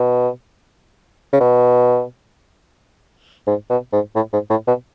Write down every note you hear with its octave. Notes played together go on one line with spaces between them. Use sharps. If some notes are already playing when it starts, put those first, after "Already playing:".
Already playing: B2
C#3
B2
G#2
B2
G#2
A2
G#2
A2
B2